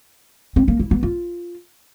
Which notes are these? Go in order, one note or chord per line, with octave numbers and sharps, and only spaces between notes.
C4
A#3
E4
B3
F4